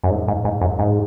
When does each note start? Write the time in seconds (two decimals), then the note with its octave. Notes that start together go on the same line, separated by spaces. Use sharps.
0.04 F#2
0.11 G#2
0.28 G#2
0.45 G#2
0.61 F#2
0.79 G#2